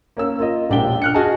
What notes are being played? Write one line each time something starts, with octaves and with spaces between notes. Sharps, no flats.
A#3 C#4 E6
A#3 F4 D#5
E1 A#1 D4 G4 G5 G7
F6 F#6 C#7
F#4 G#4 D#5 G#5 A5